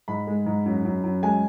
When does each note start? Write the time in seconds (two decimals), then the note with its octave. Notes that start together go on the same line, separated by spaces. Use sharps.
0.08 G#2 B5
0.27 G#3
0.46 G#2
0.66 F#2
0.85 F#2
1.03 F#2
1.23 G#3 G#5